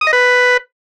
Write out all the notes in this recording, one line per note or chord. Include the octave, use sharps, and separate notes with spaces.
D#6
D#5
B4